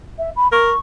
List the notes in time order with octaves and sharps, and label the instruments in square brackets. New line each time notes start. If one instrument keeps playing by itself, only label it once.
[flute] E5
B5
[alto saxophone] A#4 [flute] C#6